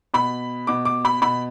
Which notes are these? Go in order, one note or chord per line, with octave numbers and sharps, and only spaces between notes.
B2 B5
B2 D6
D6
B5
B2 B5